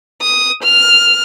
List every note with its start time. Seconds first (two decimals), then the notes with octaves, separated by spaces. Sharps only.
0.22 D#6
0.63 F6